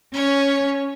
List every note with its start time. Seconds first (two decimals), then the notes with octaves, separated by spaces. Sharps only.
0.14 C#4 C#5